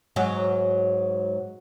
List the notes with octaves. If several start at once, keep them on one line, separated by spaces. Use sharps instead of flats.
G#2 F#3